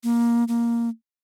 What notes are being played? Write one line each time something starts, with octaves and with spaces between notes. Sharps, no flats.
A#3
A#3